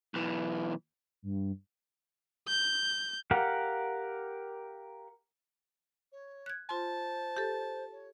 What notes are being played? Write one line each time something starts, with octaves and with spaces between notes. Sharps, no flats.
B1 E3
G2
G6
G4 A#4 F5 F#5
C#5
F#6 G#6
F4 C5 A5 C6
G4 A4
C#5